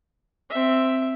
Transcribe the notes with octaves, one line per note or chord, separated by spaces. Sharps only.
C4 E5